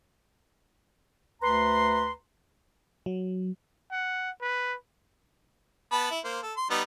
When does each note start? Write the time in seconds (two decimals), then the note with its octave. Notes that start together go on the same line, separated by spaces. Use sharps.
1.42 D2 B4 A#5 C6
3.06 F#3
3.92 F#5
4.41 B4
5.92 B3 A5 B5
6.11 E4
6.25 A#3 C5
6.43 A4
6.57 C6
6.70 G3 B3 D#4